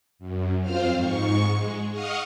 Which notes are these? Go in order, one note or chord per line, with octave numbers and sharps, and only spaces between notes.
F#2
F2 C4 F4 C5 F5 F6
G#2 C#6
G#3
D#5 F5 F#5 C#6 D#6 F6